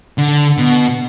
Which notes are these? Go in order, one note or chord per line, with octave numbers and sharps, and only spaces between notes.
D3
B2